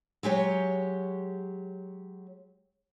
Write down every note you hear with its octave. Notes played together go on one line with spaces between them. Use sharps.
F#3 G#3 G4 C#5